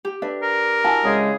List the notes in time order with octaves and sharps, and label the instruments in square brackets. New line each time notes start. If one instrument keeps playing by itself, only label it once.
[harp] G4
[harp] D4 [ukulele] B4 E5
[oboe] A#4
[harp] E4 [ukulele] F#4 G#5 A5
[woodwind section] C#3 G#3 G#4